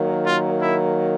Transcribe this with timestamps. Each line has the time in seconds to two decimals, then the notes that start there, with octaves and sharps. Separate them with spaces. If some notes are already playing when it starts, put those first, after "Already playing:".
Already playing: D#3 F#3 A#3
0.24 F4
0.62 E4